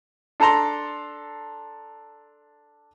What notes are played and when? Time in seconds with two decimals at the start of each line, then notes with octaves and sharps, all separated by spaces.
0.40 D4 A4 A5 A#5 C6